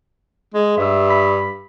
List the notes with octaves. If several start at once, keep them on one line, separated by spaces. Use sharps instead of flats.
G#3
G2 E5 E6
B5 B6